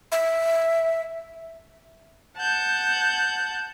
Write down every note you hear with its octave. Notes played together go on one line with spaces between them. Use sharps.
E5
F#5 A5 G6